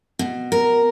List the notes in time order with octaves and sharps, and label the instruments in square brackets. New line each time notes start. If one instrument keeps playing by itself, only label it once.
[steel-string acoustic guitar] B2
A#4